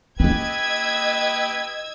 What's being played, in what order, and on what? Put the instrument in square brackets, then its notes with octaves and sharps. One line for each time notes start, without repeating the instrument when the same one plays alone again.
[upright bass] A#3 C#4 [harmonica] G4 B4 [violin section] D#5 E6 G#6